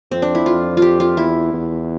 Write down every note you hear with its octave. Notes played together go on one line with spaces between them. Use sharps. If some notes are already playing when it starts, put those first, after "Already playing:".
F2 C4
D4
E4
F2 F4
F4
G4
F4
E2 E4
E2